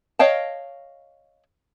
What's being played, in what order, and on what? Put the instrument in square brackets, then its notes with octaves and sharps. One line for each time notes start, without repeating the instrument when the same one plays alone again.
[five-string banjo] C#5 D#5 F5 G5 A5